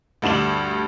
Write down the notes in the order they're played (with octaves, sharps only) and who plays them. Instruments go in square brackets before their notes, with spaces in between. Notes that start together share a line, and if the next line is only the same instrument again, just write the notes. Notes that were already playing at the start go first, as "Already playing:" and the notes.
[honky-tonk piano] D2 G2 D4 E7 F#7